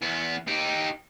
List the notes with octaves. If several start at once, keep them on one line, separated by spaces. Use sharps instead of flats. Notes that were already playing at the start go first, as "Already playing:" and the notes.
E2 B3
D#4 G4